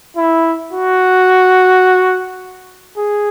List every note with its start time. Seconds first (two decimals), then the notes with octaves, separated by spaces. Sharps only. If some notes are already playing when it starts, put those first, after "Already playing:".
0.17 E4
0.72 F#4
2.97 G#4